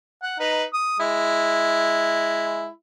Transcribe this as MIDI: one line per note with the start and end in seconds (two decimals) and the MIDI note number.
0.22 0.36 78
0.40 0.64 63
0.40 0.64 71
0.74 0.97 87
1.00 2.68 56
1.00 2.68 64